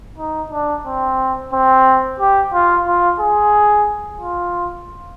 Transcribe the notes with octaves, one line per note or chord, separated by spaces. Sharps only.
D#4
D4
C4
C4
G4
F4
F4
G#4
F4